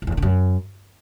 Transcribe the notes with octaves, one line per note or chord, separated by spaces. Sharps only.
F2
E2
G2
D3
F#2